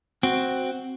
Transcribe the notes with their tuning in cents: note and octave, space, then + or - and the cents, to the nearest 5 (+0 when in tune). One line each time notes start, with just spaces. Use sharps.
C4 +0 F#4 +0